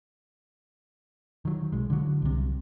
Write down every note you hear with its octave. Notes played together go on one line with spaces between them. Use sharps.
D#3 F#3
B1 G#3
D3 F#3
C2 C3